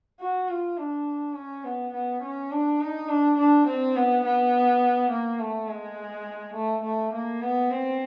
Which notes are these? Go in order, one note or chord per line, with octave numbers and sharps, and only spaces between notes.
F#4
F4
D4
C#4
B3
B3
C#4
D4
D#4
D4
D4
C4
B3
B3
A#3
A3
G#3
A3
A3
A#3
B3
C4